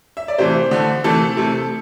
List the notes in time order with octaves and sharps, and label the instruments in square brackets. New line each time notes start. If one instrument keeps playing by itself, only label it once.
[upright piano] E5
D5
C3 E3 A3 G4 C5
D3 A3
C3 E3 A3 A4
C3 A3